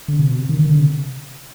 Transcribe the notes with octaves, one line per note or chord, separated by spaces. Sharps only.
D3
C3
B2
C3
D#3
D#3
D3
C3